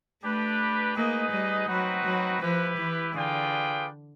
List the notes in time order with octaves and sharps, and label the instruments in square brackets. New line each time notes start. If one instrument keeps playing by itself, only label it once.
[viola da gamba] A3 [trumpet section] D4 G4 B4
[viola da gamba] A#3 [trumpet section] D#4 G#4 B4 D#5
[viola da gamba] G3
[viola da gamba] F#3 [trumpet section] C4 D#4 F#4 B4
[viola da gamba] F#3
[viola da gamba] F3 [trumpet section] E4 G4 B4
[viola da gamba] E3
[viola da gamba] D3 [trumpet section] F4 G#4 B4 D5 G5